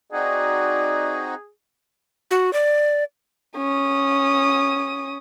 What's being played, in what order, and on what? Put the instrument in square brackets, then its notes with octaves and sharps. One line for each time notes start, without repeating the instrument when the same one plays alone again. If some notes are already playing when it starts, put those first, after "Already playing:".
[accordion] C4 D#4 F#4 [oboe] G#4 [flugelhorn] D5
[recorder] F#4
D5
[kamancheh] C#4 D#6